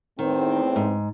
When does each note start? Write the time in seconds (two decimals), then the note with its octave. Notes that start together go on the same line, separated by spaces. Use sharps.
0.19 E2 A2 D#3 C4
0.76 G#2